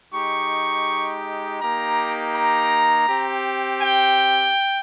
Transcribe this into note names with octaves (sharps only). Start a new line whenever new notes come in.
G#3 D#4 G4 C#6
A#3 D#4 G4 A#5
A#5
C4 G4
G5